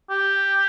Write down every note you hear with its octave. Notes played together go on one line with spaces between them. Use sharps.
G4